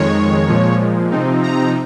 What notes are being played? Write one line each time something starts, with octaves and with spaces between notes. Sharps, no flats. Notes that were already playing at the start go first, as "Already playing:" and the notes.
Already playing: F2 D#3 G#3 C#5
A#2 F3 G#3
C3 F3 C4 D#4
A#5